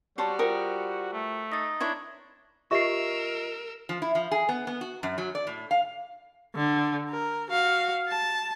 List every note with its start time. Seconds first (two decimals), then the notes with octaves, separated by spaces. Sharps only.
0.18 G3 F#4 C5 C#5 A5
0.39 F4 A#4 C5 G5 D#6
1.13 A3
1.52 D#4 A6 A#6
1.81 D4 E4 C5 C#5 G#6
2.71 F4 G4 A#4 D#5 E5 C#6 E6 C7
3.89 F3
4.02 E4
4.15 F3
4.31 G#4
4.49 B3
4.67 B3
4.81 F#4
5.03 F#2
5.18 F#3
5.35 D5
5.47 A2
5.71 F5
6.56 D3
7.10 A#4
7.51 F#4 F5
8.08 A5